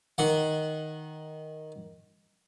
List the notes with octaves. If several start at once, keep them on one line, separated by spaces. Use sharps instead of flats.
D#3 F#5